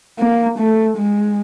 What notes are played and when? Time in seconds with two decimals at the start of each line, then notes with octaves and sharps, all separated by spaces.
0.18 A#3
0.58 A3
0.98 G#3